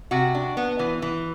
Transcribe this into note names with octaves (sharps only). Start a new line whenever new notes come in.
C3 F#4
D4
B3
E3
E3